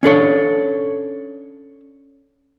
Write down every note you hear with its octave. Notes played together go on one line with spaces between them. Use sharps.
C#4 D4 A4 C#5